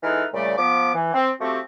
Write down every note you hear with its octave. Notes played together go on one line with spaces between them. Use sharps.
E3 G#3 D#4 A4 B4 F6
A#2 C#3 G3 A3 D5
F3 B3 D6
E3
C4
F3 A3 C4 F#4 G4